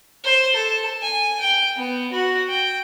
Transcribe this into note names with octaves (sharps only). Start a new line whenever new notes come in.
C5
A4
G#5
G5
B3
F#4
G5